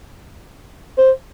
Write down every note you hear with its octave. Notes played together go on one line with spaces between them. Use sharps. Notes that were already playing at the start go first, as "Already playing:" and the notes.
C5